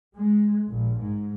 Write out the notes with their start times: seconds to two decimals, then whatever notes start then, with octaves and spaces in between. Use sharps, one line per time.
0.16 G#3
0.68 A#1
1.00 G#2